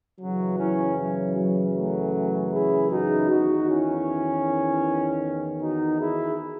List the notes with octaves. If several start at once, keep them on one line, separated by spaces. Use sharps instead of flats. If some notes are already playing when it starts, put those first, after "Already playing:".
F#2 C#3 E3 F#3
C#4 E4
F#3
F#3
F#3 A3
E4 G#4
D#4 F#4
E2 D#3 D#4 F#4
C#4 E4
D#4 F#4
E4 G#4